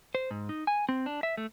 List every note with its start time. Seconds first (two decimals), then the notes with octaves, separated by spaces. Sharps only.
0.15 C5
0.31 G#2
0.49 D#4
0.67 G#5
0.89 C4
1.06 D4
1.23 E5
1.37 A3